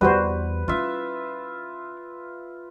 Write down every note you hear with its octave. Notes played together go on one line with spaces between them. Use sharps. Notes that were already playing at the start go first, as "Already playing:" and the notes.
E2 G3 B3 F#4 B4 C5
C#4 E4 F4 E5